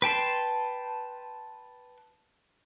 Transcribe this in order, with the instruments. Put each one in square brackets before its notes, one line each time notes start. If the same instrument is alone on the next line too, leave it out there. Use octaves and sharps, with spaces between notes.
[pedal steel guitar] B4 G5 A5 C6